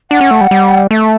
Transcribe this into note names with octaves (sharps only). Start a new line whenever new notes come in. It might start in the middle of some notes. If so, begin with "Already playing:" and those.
D4 F#5
C#4
A3
G3
G3
A3 E5